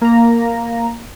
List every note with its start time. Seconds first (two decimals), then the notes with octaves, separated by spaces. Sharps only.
0.01 A#3 A#5